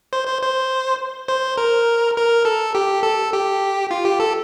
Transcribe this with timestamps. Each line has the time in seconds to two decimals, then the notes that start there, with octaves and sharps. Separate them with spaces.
0.13 C5
0.27 C5
0.42 C5
1.28 C5
1.58 A#4
2.17 A#4
2.45 A4
2.75 G4
3.03 A4
3.33 G4
3.91 F4
4.05 G4
4.20 A4